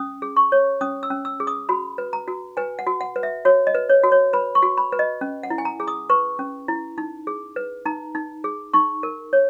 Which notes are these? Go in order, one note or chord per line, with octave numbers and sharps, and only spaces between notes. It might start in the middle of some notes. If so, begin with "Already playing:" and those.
Already playing: C#4 D#6
G#4
C#6
C#5
C#4 D#6
E6
C#4
E6
G#4
D#6
F#4 B5
B4
A#5
F#4
B4 G#5
F#5
F#4
F#5
B4
E5
F#4 C#5
D#5
B4
C#5
F#4
C#5
B4 B5
C#6
F#4
B5
B4
D#5
C#4
F#5
E4
G#5
A#5
G#4
D#6
B4 C#6
C#4
E4
D#4
G#4
B4
D#4 A#5
D#4
G#4
D#4 C#6
A#4
C#5